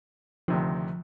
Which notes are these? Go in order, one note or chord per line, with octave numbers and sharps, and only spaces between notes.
D2 C3 D#3 F3